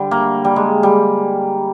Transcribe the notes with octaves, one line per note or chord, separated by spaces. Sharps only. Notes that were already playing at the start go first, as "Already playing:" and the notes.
Already playing: D3 G3
A#3
G3
G#3
G3